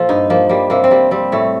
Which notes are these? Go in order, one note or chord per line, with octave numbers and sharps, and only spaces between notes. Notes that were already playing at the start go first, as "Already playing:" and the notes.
Already playing: A#2 F3 F4 A4
G2 D#4
F3 A#3
G3 A#3
C3 A#3
C4
G3 A#3
G3 C4
A2 A3